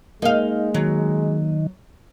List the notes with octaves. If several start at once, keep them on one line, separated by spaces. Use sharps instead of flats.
G#3 A#3 D#4 F5
D#3 F#3